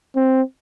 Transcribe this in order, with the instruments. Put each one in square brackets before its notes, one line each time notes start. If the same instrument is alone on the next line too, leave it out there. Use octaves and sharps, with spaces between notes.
[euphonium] C4